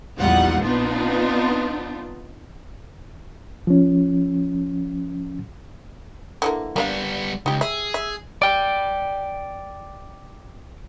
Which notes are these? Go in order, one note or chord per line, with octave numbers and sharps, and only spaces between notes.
A#1 E2 G3 D#4 F4 F#5
B3 C4 D4 D#4 F4
F3 C#4
D3 E3 A#3
G3 A#3 B3 D4 F5
C#2 D#4 G4
G#4 E5
E5
D5 G5